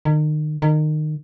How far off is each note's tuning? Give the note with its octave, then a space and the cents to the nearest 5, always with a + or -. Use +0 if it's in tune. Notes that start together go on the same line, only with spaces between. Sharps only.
D#3 -35
D#3 -25